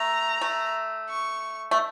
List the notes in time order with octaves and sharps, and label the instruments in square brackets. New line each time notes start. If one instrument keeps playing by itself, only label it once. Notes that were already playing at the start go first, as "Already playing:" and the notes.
Already playing: [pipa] A3 [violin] A#5
[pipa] A3
[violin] C#6
[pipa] A3